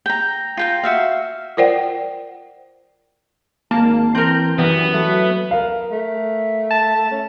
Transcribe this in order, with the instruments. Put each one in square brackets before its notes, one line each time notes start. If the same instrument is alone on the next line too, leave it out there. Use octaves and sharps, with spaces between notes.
[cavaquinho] G5 A#5
F4 G5 A#5
F#4 E5 F5
[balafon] F4 A#4 C5 D5 F#5 G5
[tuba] G#1 [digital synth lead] A#3 [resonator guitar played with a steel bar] A5
[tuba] E3 [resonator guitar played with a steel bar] C4 A#4 [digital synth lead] G6
[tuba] F#2 [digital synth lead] E3 [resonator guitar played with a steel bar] G3 [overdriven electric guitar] B3
[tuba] F#3 [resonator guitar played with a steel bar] A3
[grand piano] A#4 F5
[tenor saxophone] A3
[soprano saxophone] A5
[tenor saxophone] C#4